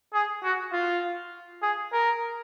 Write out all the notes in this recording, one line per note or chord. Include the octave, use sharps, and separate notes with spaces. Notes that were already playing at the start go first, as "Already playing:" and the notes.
G#4
F#4
F4
G#4
A#4